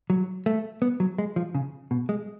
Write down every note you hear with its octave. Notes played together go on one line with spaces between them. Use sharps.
F#3
A3
B3
F#3
G#3
F3
C#3
B2
G#3